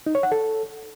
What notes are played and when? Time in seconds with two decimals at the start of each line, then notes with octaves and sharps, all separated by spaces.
0.06 D#4
0.15 C#5
0.23 F#5
0.32 A4